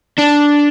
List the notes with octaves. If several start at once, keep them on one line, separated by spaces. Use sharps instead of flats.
D4